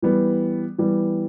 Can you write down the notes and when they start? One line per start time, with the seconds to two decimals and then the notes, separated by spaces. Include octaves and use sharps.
0.02 E3 G3 B3
0.78 E3 G3 B3